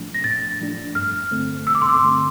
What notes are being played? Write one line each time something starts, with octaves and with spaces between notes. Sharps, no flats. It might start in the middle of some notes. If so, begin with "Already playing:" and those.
Already playing: A2 F3 A3 D4
A#6
A2 A6
F3 A3 D4
G2 F6
D3 A3 C4
G2 E6
D6
C6
D6
D3 A3 C4